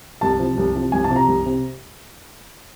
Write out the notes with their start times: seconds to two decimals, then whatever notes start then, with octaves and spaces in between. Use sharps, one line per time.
0.21 C2 A5
0.39 C3 F3
0.57 C2
0.75 C3 F3
0.92 C2 G#5
1.04 A5
1.10 C3 F3
1.16 A#5
1.28 C2
1.46 C3